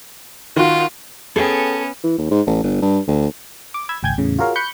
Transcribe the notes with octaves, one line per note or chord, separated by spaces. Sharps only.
D#3 F4 F#4
B3 C#4 G#4 A4 G5
E3
D#2
G#2
A1
G1
G2
D2
D6
B5 E6 G#6
G#1 C#2 G5 G#5 G6 G#6
E2 A2 C#3
F4 F#4 G#4 A#4 C#5 F5
B5 C#6 F#6 G6 C#7